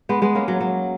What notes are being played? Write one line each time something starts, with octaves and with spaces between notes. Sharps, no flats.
G#3 B3
G#3 B3
A#3 C#4
F#3
F#3